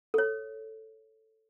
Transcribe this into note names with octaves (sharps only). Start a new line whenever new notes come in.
A4 C#5